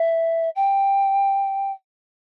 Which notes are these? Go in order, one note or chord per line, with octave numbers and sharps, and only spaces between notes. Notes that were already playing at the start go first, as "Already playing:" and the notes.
Already playing: E5
G5